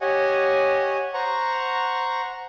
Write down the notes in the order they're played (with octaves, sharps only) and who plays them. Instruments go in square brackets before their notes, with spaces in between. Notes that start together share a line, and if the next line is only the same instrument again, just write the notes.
[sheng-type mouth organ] G4 C#5 D#5 F#5 G#5
C5 F#5 A#5 C#6